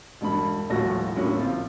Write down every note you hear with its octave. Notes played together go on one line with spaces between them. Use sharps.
E1 G2 B5
D#1 B1 A2 F3 F#4 A#6
A2 D3 F#3 A#3 C#4 A4
A#1 C4 F4